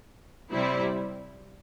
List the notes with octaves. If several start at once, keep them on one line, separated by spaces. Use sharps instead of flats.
C3 G3 C4 E4